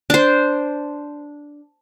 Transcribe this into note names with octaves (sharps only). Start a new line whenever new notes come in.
D4 C5